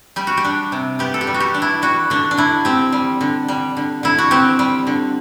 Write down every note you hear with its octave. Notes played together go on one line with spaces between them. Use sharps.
G3 G4
F#4
G4
D4
C3
B3 G4
A4
G4
G3
F#4
G4
D4
E4
G3 F#4
D3 D4
D4
D3 E4
C4 G4
G3
D3
G3
D3
D3 E4
F#4
C4 G4
G3
D3